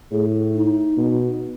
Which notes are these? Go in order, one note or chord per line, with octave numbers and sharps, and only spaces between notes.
A2 G#4
D#4
B2